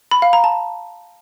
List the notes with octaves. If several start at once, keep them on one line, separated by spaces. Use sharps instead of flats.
B5
F5
A#5
A5